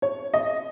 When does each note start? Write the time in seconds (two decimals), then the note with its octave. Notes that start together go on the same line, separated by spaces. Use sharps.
0.02 C#5
0.34 D#5